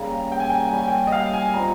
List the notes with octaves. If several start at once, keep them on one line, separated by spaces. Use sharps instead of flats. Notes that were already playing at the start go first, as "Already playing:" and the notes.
Already playing: C#3 G3 A#3 A#5
G5
G#5
G5
G#5
G3 C#4 G4 G5
G#5
G5
D#5
F5
G#5
A#2 G3 C4 D#4 A#5